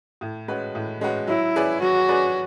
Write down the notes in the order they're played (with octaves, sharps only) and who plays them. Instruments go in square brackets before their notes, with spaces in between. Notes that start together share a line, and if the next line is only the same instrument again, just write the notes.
[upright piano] A2
G#3 C#4 F#4 B4
A2
G#3 C#4 F#4 B4
[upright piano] F#3 [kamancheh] E4
[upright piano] C#4 G#4 B4 D5
[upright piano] F#3 [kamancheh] F#4
[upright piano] C#4 G#4 B4 D5